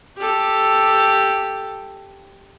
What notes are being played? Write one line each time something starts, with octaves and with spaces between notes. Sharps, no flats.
G4 A4